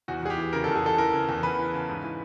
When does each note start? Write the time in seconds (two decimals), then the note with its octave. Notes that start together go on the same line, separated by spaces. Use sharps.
0.08 E2 F#4
0.23 E2 G#4
0.30 G4
0.38 E3
0.53 C#3 A#4
0.64 E2 A4
0.75 G#4
0.83 E2 A4
0.98 E3 A#4
1.13 C#3
1.29 E2
1.43 E2 B4
1.59 E3
1.74 C#3
1.89 G#2
2.04 E3